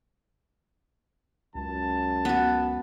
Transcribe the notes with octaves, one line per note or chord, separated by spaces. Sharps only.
C#2 F#2 A5
B3 F#4